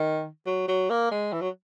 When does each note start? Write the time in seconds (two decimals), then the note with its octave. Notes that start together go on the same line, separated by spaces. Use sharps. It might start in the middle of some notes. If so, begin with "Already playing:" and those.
Already playing: D#3
0.46 F#3
0.68 F#3
0.90 A#3
1.12 G#3
1.33 E3
1.41 F#3